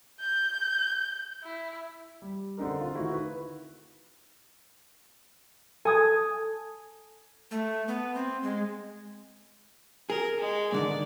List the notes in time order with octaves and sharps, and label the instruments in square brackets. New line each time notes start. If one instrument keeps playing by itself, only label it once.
[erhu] G6
E4
[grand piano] G3
D3 C4 D4 D#4 A#4
F4
D#3 A3 D#4 E4 F#4
B4
[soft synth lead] A4 [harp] G#5 D#6 G#6
[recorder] A3
B3
C4
G#3
[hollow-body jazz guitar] G#4 [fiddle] A#4
[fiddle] G#3
[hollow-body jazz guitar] G#2 D3 D#3 [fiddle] D5